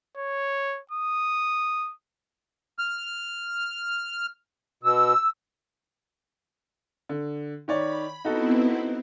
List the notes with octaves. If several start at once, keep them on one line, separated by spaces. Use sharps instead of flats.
C#5
D#6
F6
B2 E6
D3
D#3 C#5 D5 B5
B3 C4 D#4 E4 F#4 A4